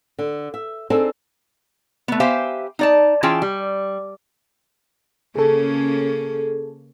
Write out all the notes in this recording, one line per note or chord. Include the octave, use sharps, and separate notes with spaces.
D3
E5
C4 D4 D#4 G#4 A4
A3 B3
G4 C5 E5 F5 G#5
D#4 D5 A5
E3 C#4 F4 G#4 G5 A5
G3
C#3 A#3 C#4 G#4 A4